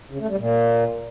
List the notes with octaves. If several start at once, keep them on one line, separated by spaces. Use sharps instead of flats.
C#3
A3
G3
A#2